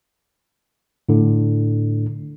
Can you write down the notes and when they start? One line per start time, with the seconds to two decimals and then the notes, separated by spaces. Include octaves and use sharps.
1.09 A2 D3